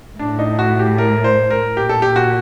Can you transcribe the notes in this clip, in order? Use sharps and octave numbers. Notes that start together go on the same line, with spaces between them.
A2 D4
D#4
F#4
G4
A#4
C5
A#4
A#2 G4
A4
G4
F#4